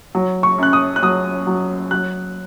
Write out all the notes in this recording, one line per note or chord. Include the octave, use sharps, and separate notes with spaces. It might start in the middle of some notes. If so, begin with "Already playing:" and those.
F#3
C#6
F#2 F#6
D#6
F#6
F#3 D#6
F#3
F#3 F#6